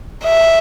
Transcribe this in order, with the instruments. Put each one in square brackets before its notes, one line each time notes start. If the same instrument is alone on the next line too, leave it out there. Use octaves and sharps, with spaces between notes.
[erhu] E5